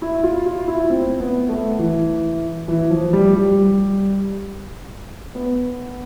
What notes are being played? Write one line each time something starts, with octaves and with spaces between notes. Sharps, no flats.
E4
F4
F4
E4
C4
B3
A3
E3
E3
F3
G3
G3
B3